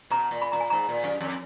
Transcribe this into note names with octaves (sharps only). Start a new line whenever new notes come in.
B2 A#5
A#2
B5
A#2 A#5
G#5
G#2 A#5
A#2
F#2
F2